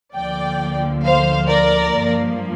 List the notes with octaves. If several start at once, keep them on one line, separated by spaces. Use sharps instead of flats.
D2 D3 F3 A#3 D5 G5
C5 F5
A#4 D5
G2 F3 A#3